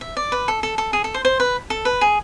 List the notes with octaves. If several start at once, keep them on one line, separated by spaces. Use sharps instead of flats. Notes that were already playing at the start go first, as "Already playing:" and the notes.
E5
D5
B4
A4
A4
A4
G#4
A4
C5
C5
B4
A4
B4
G#4